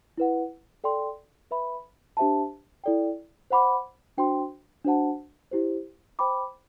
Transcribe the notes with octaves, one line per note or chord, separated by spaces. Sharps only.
E4 B4 F#5
A4 D5 G5 C6
B4 E5 B5
D4 G4 C5 E5 A5
E4 A4 D5 G5
C5 F#5 B5 D6
D4 F#4 C5 G5 C6
D4 F#4 C5 F#5 A5
E4 G4 C5
C5 G5 B5 D6